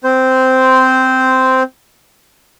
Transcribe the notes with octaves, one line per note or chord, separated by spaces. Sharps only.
C4 C5